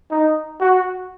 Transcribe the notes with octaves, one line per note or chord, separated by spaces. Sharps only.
D#4
F#4